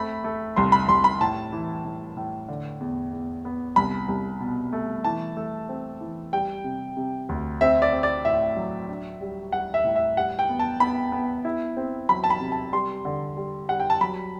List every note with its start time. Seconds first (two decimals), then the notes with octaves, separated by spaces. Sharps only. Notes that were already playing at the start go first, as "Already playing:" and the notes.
Already playing: A3 C4 B5
0.24 A3
0.56 C2 C6
0.72 B5
0.88 C2 C6
1.04 B5
1.21 A2 A5
1.53 E3
1.85 A2
2.17 A2
2.48 D3
2.80 E2
3.13 E2
3.45 B3
3.76 C2 B5
4.08 C2
4.40 B2
4.73 A3
5.04 E3 A5
5.37 A3
5.69 C4
6.01 E3
6.33 G3 G5
6.64 C3
6.97 C3
7.29 D2
7.61 C4 E5
7.82 D5
7.93 C4
8.03 D5
8.25 A2 E5
8.57 F#3
8.89 D4
9.21 G3
9.52 G3 F#5
9.74 E5
9.84 A2
9.96 E5
10.17 G3 F#5
10.39 G5
10.49 B3
10.59 A5
10.80 B3 B5
11.12 B3
11.45 E4
11.77 C4
12.09 F#3 B5
12.24 A5
12.30 B5
12.40 C3
12.52 A5
12.72 G3 C6
13.05 D3
13.37 G3
13.69 G3 F#5
13.80 G5
13.90 A5
14.01 F#3 B5